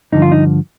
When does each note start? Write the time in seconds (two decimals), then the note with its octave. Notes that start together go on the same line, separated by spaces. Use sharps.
0.12 G2 D3 F3 D#4
0.22 F4
0.32 D#4